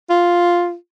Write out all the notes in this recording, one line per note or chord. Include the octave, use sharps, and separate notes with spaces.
F4